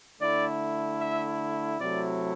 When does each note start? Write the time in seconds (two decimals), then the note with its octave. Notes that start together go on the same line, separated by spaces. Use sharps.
0.21 D3 A3 E4 D5
1.01 E5
1.81 C3 F#3 A3 E4 D5